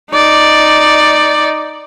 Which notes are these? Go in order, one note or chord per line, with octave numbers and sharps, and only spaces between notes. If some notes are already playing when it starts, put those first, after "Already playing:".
D#4 D5